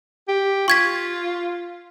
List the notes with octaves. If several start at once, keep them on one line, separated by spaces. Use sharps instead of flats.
G4
F4 C#6 G#6 B6